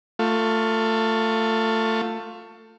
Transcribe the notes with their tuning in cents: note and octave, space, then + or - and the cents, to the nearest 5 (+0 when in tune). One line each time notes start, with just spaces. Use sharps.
A3 +20 F4 +10